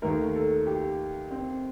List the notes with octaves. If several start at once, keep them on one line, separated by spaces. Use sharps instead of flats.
D#2 D#3 A3 A#4
A4
G4
C4